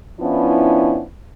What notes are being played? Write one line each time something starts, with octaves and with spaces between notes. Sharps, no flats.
F3 B3 C#4 D4 E4